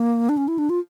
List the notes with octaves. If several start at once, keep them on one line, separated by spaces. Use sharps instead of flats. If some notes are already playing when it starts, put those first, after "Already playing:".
Already playing: A#3
D4
C#4
E4
D4
F4